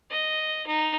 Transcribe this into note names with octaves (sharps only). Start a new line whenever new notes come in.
D#5
D#4